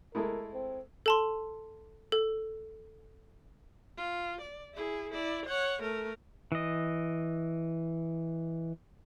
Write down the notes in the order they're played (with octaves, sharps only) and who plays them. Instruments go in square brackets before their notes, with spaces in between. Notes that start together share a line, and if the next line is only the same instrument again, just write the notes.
[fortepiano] G#3 A3 E4 [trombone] A#4
[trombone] C4
[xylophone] A4 A5 C6
A4
[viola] F4
D5
E4 G#4
E4 D5
C#5 F#5
A3 A#4
[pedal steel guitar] E3 D#5